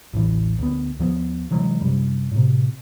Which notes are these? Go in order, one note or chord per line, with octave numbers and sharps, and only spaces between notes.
A1 D#2 E3
D2 B3
D#2 F3 A3 B3
C3 E3 F#3 G#3
F#2 C3 G3
A2 C3